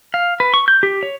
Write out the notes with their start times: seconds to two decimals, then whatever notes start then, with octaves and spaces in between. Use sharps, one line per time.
0.14 F5
0.40 B4
0.54 C#6
0.68 G6
0.83 G4
1.03 C#5